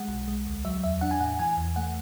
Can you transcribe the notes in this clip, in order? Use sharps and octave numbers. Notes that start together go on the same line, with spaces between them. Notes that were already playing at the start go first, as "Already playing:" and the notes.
Already playing: G#3 F#5
B1
G#3
D2
F#3 E5
E2 E5
D4 F#5
G#5
A2 F#5
E3 G#5
E2
A3 F#5